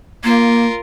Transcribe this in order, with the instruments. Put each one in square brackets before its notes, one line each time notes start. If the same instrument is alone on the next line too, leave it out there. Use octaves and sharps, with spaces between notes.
[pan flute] A#3 [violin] F4 A#4